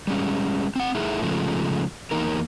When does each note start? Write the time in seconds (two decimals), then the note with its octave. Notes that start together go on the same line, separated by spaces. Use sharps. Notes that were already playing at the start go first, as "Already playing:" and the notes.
0.07 G3 G#3 C#4
0.76 C4 F#5
0.95 A3 D#4 E4 G#4
1.22 C#3 F3 G#3 A3
2.11 E2 A#3 D#4 A#4